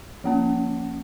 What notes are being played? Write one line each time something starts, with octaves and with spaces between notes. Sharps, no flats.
F3 A#3 C#4